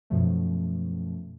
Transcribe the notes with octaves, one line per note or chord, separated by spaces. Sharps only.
F#2 B2 F3 A3